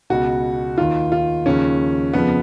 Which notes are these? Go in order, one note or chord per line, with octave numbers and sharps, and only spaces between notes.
C#2 B2 F#4
D#2 D#3 F4
F4
D#2 C#3 F3 C#4
F2 C#3 F3 B3